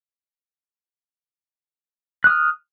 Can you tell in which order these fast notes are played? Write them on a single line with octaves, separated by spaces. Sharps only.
F#6 D#6 F6